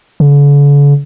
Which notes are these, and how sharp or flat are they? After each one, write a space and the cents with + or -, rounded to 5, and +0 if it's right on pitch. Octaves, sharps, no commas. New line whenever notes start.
D3 -45